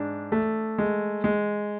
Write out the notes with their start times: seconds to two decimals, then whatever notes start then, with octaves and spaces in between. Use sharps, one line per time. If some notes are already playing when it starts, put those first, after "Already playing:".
Already playing: G#2 D4
0.32 A3
0.79 G#3
1.24 G#3